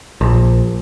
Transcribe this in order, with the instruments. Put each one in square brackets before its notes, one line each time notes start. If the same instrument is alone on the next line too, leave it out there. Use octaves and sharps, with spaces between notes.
[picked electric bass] A#1